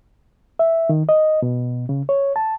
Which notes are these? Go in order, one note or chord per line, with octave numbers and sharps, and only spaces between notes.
E5
D#3
D#5
B2
C#3
C#5
A5